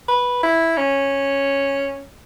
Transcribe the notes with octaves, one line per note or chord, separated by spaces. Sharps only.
B4
E4
C#4